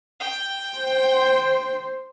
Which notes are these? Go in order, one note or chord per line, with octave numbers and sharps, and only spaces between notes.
G5
C5